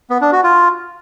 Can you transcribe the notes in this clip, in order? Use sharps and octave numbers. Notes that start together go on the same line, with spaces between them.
B3
D4
F#4
F4